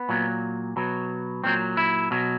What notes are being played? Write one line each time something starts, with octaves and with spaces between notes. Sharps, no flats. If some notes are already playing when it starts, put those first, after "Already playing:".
Already playing: B3
A#2 F#3
B2 F#3
A#2 F#3 C4
E4
B2 F#3